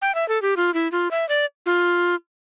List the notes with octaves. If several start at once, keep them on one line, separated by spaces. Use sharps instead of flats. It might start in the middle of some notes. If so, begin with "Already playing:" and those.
G5
E5
A4
G4
F4
E4
F4
E5
D5
F4